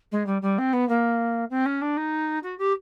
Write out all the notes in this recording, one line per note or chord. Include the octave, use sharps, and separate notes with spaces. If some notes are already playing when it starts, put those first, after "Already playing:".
G#3
G3
G3
C4
B3
A#3
C4
C#4
D4
D#4
F#4
G4